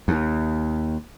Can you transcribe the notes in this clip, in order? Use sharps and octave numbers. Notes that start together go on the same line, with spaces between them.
D#2